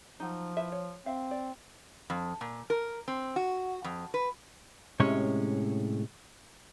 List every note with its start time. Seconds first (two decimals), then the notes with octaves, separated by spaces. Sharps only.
0.20 F3 F#3 D#4
0.57 E4 B4 E5
0.72 C#5
1.06 C4 E5 F5
1.31 D5
2.10 F2
2.41 A#2
2.70 A#4
3.08 C4
3.36 F#4
3.84 F2
4.14 B4
5.00 A2 C3 G#3 C#4 C#5